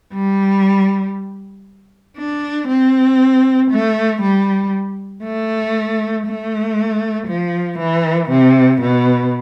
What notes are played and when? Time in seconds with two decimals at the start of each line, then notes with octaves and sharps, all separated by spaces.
0.13 G3
2.18 D4
2.68 C4
3.71 A3
4.22 G3
5.24 A3
6.27 A3
7.28 F3
7.79 E3
8.30 C3
8.82 B2